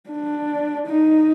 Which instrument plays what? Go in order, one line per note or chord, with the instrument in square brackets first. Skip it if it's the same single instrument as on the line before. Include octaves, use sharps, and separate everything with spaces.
[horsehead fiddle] D4
D#4